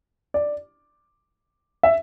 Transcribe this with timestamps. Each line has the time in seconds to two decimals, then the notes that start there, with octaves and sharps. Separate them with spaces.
0.34 D5
1.83 E5